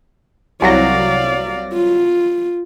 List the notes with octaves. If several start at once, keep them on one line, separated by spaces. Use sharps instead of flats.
C2 F#3 D5 F5 A#6
F4